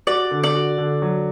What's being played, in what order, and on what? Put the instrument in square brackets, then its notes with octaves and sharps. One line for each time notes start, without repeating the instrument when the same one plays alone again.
[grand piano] F#4 [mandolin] D5
[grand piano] D3
[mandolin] D5
[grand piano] F#4
D3
F#3